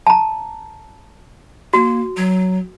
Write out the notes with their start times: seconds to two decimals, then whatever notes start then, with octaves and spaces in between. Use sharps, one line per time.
0.07 A5 A#5
1.73 A#3 F#4
2.17 F#3